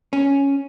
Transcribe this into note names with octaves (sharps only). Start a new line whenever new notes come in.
C#4